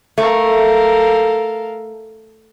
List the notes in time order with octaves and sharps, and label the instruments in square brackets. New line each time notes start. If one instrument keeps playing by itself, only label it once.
[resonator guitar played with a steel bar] A3 [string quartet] A4 A#4 F5